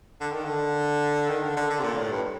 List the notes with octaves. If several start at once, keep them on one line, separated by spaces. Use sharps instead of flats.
D3
D#3
D3
D#3
D3
D3
D3
C3
A#2
A2
G2